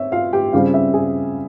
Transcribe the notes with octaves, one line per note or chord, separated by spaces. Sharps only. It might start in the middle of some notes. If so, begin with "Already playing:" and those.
Already playing: C4 C#5 E5
F4 F5
G4 G5
C#3 G3 C4 F4 F5
E5
G#4 G#5